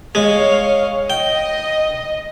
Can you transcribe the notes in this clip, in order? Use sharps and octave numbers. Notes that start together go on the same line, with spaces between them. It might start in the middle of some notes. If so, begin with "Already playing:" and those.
G#3 C#5 F5
D#5 G5